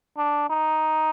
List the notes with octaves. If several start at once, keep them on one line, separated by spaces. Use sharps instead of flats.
D4
D#4